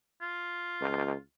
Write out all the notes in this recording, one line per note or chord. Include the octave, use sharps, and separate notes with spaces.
F4
C#2